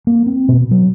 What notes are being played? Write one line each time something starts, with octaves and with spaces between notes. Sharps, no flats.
A#3
C4
B2
F#3